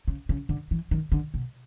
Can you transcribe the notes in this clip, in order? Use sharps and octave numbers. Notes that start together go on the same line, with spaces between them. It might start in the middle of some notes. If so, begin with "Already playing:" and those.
C#3
C#3
D3
E3
D#3
D3
B2